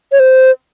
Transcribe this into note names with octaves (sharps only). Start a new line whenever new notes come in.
C#5
C5